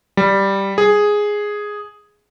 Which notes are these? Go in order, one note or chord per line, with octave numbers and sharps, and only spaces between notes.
G3
G#4